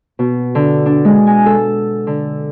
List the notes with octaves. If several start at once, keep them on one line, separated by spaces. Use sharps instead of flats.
B2
D3
D4
G#3
G#5
A4
D3